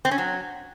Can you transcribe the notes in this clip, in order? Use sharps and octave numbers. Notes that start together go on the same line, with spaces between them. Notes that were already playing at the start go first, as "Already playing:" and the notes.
C4
C#4
F#3